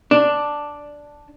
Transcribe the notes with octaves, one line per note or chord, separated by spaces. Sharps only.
D4